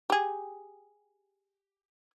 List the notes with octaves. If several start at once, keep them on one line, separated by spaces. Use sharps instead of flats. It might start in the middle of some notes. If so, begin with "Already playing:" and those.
G4 G#4